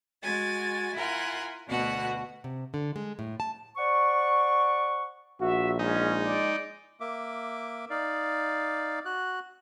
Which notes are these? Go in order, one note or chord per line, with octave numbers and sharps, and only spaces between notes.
G#3 F#4 G#5 A6
E4 F4 A#4 F#5 G#5
D2 B2 B3 F#4 F#5
C3
D3
G#3
A2
A5
C5 D5 F#5 C#6
A#1 F#4 E5
G#3 C#4 D#4
D5
A#3 E5 D6
D#4 D5 F5
F#4 F#6